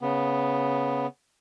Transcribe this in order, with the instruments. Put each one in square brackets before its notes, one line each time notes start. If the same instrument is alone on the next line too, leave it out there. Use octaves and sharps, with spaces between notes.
[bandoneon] C#3 B3